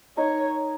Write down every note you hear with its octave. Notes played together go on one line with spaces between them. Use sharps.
D#4 A#4 C#5 D#5